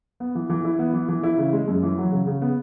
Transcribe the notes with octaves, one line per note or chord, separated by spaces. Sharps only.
B3
E3
E3
E4
B3
E3
E3
E4
C#3
G#3
F#2
E3
F#3
C#3
C#3
B3